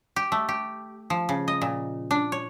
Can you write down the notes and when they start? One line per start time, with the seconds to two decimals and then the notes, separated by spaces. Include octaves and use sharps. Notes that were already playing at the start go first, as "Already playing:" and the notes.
0.16 G4
0.32 A3
0.49 G4
1.10 F3
1.29 C#3
1.48 D#5
1.61 A#2
2.11 D4
2.32 C#5